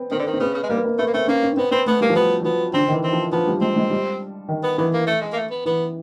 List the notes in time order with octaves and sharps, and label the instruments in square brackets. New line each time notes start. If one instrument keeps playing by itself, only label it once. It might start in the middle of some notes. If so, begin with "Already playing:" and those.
Already playing: [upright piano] B3 C4
[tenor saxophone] D#3 [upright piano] C4
[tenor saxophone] D3
D#3
[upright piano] C4
[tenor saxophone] C#3 [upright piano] B3
[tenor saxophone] C#3
G#3
[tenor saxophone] G3 [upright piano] A#3
[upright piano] B3
A#3
[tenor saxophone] A3 [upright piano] B3
[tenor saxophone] A#3
[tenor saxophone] A3 [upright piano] C4
[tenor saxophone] A#3 [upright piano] C#4
[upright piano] C#4
C#4
[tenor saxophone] B3 [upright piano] C4
[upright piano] B3 [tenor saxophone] C4
[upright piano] A3 [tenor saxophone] B3
[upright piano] G3 [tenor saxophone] A#3
[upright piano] F3
[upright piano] F#3 [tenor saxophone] B3
[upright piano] F#3
[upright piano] F3 [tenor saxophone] B3
[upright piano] D3 [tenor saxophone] C4
[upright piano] D#3
E3
[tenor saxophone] C4
[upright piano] F3
[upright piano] F3 [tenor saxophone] B3
[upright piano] G3
[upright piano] G#3 [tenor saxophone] C4
[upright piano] G#3
G3
D#3
[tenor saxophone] B3
[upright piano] E3 [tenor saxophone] B3
[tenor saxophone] A#3
A3
G#3
A#3
A3
B3
[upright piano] E3 [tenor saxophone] B3